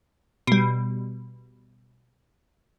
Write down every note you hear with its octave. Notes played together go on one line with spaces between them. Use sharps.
B2 G3